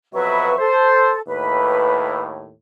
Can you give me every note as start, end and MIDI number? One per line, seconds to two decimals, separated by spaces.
0.14 0.52 41
0.14 0.52 47
0.14 0.52 54
0.14 0.56 71
0.14 0.56 76
0.14 0.56 85
0.58 1.19 69
0.58 1.14 72
1.28 2.52 39
1.28 2.52 45
1.28 2.21 71